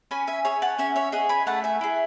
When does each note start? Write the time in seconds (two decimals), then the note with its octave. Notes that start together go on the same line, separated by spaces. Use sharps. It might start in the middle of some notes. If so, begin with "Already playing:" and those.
0.11 C#4 G#5 B5
0.27 E5 G#5
0.45 G#4 C#5 E5
0.62 F#5 A5
0.78 C#4 E5 G#5
0.96 C#5 E5
1.12 G#4 D#5 F#5
1.29 G#5 B5
1.47 A3 F#5 A5
1.64 E5 G#5
1.81 E4 G#4